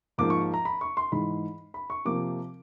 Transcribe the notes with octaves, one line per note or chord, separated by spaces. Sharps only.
G#2 F3 A#3 D6
C#6
A#5
B5
C#6
C6
G#2 E3 G#3 B5
B5
C#6
C3 F3 A#3 D6